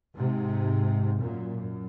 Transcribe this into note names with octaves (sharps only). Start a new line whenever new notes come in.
G#2 C3
F#2 A#2
F#2